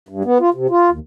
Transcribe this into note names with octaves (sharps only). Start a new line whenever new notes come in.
G2
B3
F4
C3
F4
D#2